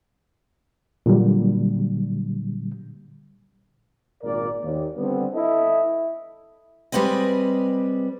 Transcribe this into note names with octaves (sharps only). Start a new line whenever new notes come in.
A#2 D3 F#3 G3
G#1 A#2 A#4 D5
D#2
D3 G3 B3 C4
E4 A4 D#5 E5
G3 G#3 C4 B4 D#5